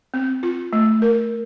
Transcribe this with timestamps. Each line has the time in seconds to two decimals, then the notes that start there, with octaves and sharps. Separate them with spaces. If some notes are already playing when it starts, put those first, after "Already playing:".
0.14 C4
0.43 F4
0.73 A3
1.02 A#4